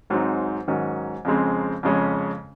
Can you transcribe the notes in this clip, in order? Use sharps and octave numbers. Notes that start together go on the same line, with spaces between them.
G#1 G#2 F#3 C4 D#4
G#2 D#3 F#3 C#4
F2 C#3 G#3 C4
F2 C#3 G#3 C#4